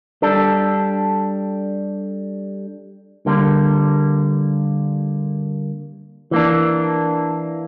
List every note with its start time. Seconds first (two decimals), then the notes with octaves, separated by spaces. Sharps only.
0.22 G3 D4 A4
3.26 D3 G3 A#3
6.31 E3 A#3 D4